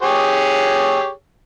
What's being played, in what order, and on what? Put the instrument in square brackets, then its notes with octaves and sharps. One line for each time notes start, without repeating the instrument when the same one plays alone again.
[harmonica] G4 G#4 C#5